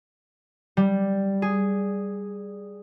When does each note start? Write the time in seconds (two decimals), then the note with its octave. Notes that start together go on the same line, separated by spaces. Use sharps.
0.77 G3
1.42 G#4